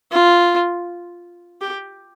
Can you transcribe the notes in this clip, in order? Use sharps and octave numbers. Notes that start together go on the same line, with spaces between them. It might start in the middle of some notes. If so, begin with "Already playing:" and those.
F4
G4